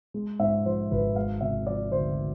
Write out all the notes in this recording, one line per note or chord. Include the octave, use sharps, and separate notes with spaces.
G#3
G#2 E5
F3 C5
G#1 B4
G#3 F5
C3 E5
F3 D5
D2 C5